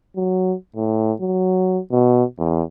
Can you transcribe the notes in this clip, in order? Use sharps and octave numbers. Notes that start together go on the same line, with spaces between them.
F#3
A2
F#3
B2
E2